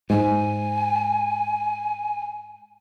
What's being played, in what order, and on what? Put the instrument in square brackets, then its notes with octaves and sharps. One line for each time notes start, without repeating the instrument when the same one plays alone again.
[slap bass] G#2 [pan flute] G#5